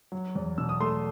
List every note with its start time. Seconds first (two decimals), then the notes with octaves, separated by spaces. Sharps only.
0.12 F#3
0.35 E2
0.58 B2 E6
0.69 D#6
0.80 A3 C6